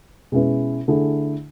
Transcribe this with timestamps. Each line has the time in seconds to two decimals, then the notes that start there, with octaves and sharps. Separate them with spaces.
0.32 B2 G#3 C#4 E4 B4
0.88 D3 A3 E4 G#4